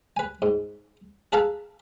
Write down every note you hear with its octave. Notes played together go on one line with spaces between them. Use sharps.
B4 G#5
G#2
G#4 A4 B4 F5 A5 A#5